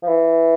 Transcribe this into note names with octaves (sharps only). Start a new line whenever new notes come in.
F3
E3